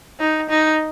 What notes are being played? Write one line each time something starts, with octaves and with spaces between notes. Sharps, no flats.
D#4
D#4